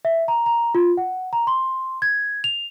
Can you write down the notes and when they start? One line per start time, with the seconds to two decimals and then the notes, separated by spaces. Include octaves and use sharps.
0.05 E5
0.28 A#5
0.46 A#5
0.75 F4
0.97 F#5
1.33 A#5
1.47 C6
2.02 G#6
2.44 F7